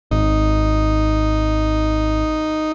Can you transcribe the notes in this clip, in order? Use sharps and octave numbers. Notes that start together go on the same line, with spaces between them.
G#1 D#4